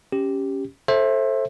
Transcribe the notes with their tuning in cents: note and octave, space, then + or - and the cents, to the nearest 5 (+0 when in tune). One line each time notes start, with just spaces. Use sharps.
C#4 +0 G4 +0
A4 +0 C5 +30 E5 +0